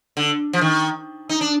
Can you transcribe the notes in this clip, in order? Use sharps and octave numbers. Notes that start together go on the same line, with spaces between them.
D3
F3
D#3
D#4
D4